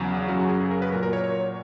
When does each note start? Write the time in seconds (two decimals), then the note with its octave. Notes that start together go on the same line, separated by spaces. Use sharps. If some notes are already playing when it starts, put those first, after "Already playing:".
Already playing: E2 C#3 F#3
0.28 F#2 C#3 F#3 F#4
0.40 F#4
0.49 G#4
0.60 G#4
0.71 A#4
0.82 B4
0.92 A#2 F#3 A#4
1.03 A#4
1.13 C#5
1.24 C#5